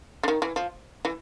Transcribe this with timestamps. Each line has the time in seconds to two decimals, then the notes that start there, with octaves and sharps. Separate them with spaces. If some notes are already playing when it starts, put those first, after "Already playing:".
0.23 D3
0.28 D#3
0.42 E3
0.56 F3
1.05 E3